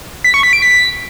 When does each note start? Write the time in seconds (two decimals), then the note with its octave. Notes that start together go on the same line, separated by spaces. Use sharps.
0.24 B6
0.34 C#6
0.43 B6
0.53 D7
0.62 B6